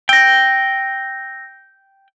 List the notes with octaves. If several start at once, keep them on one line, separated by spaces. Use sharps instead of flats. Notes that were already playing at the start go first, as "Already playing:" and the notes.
G5 E6 A#6